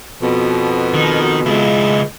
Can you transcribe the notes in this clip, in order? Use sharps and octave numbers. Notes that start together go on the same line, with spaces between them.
F2 B2
D#3
C#2 G#3 E4